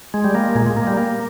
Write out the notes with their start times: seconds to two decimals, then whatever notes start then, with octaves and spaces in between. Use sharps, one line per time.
0.14 G#3
0.24 G3
0.35 A#3
0.55 A#2 G#3
0.66 G#3
0.77 A#3
0.87 G3
0.97 A#3